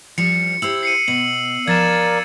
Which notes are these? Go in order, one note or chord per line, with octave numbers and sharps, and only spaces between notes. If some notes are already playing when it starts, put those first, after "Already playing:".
F3 G3 C#7
E4 G4 C5 E6 F#7
C7 C#7 D#7
B2 F#7
F3 A#4 D5 F5 G#6 A6 E7